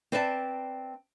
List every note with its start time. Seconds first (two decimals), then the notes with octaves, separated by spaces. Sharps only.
0.12 C4 B4 D5 E5 F5 A5